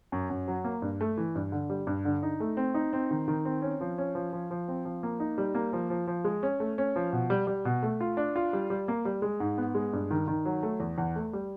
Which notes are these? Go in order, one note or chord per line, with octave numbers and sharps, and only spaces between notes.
F#2
F#2
F#3
A#3
G2
A3
E3
G2
D3
G3
G2
D3
D#4
A3
C4
D#4
C4
D#3
D#3
C4
C#4
F3
C#4
F3
F3
F3
C4
F3
A#3
D#4
G3
A#3
F3
F3
F3
G#3
C#4
A3
C#4
F3
B2
G3
G3
B2
A3
F4
D4
F4
G3
G3
A#3
G3
G#3
G#2
B3
G#3
G2
D#3
D#3
F#3
A3
E2
E2
A3
G3